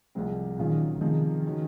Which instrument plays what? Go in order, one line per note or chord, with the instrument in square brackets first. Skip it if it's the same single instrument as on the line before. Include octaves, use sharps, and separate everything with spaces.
[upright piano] C2 C3 F3 G#3 C4
[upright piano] A#2 F#3 C#4 F4 G#4 [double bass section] D#3
[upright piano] C3 F3 G#3 D#4 G#4 [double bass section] D#3
[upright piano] C#3 G#3 C#4 F#4